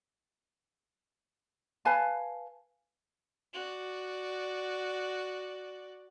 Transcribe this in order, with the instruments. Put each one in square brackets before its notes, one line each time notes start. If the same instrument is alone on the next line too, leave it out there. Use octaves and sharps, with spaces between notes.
[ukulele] B4 F5 G#5 A5
[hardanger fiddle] F#4 D5